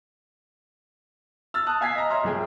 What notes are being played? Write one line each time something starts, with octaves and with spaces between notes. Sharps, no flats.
E6 F6 A6
A5 D#6 F#6
F5 G#5 G#6 B6 C7
D#5 A#5
C#5 D#5 E5 A#5 C6 F6
C2 F3 G#4 G5